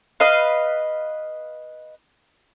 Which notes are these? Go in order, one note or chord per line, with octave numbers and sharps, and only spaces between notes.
B4 D#5 F5